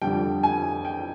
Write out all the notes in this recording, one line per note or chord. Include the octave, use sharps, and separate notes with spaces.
F2 D3 G3 G5
G#5
G5